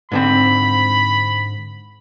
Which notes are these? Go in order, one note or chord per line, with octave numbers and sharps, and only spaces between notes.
G#2 D3 C4 B5